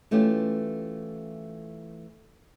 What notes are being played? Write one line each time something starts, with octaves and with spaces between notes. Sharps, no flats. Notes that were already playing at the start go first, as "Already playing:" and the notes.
E3 A3 C#4 F4 G4